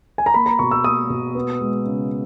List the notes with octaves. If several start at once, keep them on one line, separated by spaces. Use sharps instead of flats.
G#5
A#5
A#3 B5
A#5
B2 C#6
E6
A#3 D#6
B2
B3
G#3
C#3